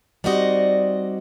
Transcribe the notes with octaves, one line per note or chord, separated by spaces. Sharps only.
G3 C4 D#4 F#4 D5 D#5